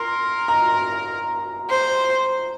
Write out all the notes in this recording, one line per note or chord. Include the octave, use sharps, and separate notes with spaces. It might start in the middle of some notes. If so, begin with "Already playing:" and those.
Already playing: A#4 C6
A#5
C5